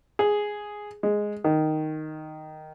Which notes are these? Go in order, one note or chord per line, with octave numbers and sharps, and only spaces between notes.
G#4
G#3
D#3